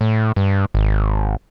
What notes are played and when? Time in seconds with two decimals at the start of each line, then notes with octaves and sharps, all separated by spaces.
0.01 A2
0.36 G2
0.74 G#1